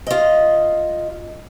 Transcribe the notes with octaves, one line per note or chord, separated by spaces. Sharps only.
F4 D#5